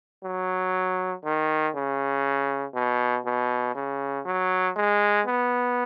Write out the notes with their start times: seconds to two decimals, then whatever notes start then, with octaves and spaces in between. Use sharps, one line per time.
0.24 F#3
1.25 D#3
1.75 C#3
2.74 B2
3.26 B2
3.75 C#3
4.25 F#3
4.76 G#3
5.27 B3